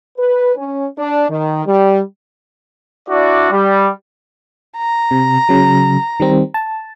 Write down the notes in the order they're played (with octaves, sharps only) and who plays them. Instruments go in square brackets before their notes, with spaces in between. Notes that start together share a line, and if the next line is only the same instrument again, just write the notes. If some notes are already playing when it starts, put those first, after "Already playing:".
[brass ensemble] B4
C#4
D4
D#3
G3
[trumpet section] D4 E4 F#4 D5
G3
[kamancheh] A#5
[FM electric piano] C3
C#3 F#3
D#3 G3 C4
A5